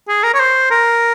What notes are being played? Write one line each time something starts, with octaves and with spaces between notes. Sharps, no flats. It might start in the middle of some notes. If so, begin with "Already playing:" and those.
G#4
A#4
C#5
C5
A#4